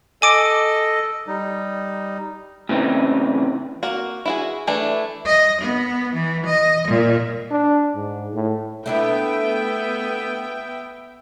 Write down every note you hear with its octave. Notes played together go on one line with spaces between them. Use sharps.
A4 D#5 G#5 D6 D7
G3 D#4
A2 C#3 E3 C4 D#4
A#3 F#4
E4 F#4 G#4
E3 A3 D4 E4
D#5
B3
E3
D#5
A#2
D4
G#2
A2
A3 B3 D4 E4 E5 G5